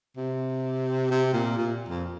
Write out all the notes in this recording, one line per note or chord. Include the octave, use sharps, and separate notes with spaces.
C3
C3
A#2
A#2
F2